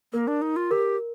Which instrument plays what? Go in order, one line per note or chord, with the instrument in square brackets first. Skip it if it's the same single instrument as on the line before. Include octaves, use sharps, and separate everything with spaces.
[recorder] A#3 [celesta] A#4
[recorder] D4
D#4
F4
[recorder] G4 [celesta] A#4